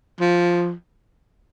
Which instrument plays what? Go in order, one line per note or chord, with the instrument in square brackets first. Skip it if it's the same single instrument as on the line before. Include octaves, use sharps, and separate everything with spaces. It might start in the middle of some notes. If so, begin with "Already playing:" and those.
[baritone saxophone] F3